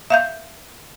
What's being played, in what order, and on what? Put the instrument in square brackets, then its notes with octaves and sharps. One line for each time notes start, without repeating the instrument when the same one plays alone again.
[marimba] E5 F5 G6